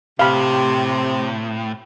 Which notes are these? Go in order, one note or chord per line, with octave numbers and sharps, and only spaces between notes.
A2 C3 F5 B5